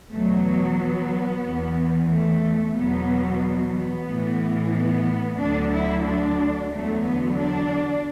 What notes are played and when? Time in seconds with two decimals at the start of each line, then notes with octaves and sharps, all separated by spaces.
0.12 E2 B2 F#3 A3
0.45 B3
0.78 B3
1.44 E2 E3
2.09 A3
2.75 E2 B2 F#3 B3
3.74 B3
4.07 A2 E3
4.74 B3
5.39 D2 D3 F#3 D4
5.72 E4
6.05 D4
6.70 E2 D3 F#3 A3
7.04 B3
7.37 D4